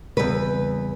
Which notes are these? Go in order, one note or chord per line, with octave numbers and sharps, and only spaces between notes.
E2 C#3 G3 C4 B4